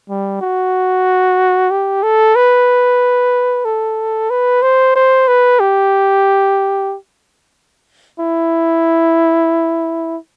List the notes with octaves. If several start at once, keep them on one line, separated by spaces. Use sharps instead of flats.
G3
F#4
G4
A4
B4
A4
B4
C5
C5
B4
G4
E4